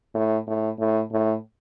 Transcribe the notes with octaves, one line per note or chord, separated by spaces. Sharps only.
A2
A2
A2
A2